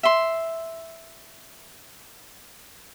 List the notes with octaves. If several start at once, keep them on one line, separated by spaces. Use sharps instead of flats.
E5 C6